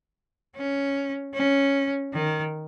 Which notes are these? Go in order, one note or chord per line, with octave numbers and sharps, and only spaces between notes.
C#4
C#4
D#3